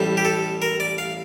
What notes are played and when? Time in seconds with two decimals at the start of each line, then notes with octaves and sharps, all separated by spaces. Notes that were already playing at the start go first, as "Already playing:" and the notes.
Already playing: A1 A2 G3
0.17 G4
0.25 A4
0.62 A#4
0.80 D5
0.98 F5